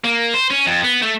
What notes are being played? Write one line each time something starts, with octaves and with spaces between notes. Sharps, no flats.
A#3
C5
C#4
F2
B3
A3